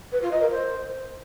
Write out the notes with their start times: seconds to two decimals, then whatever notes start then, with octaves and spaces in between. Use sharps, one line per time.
0.12 B4
0.21 F4
0.31 D#5
0.41 A#4
0.51 C5